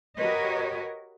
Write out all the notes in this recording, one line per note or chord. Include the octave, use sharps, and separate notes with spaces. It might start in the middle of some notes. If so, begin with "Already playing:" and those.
F#4 G4 A#4 B4 C#5 D#5